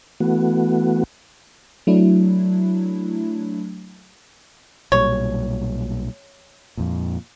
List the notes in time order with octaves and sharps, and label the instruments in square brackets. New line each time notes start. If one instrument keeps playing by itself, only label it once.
[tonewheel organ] E3 A3 B3 F#4
[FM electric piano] F#3 A3 D4 E4
[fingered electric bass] B1 A#2 G3 [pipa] C#5
[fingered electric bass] F2 A#2